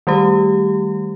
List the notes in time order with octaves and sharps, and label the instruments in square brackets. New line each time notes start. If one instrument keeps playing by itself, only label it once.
[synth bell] D#3 G3 A3 G4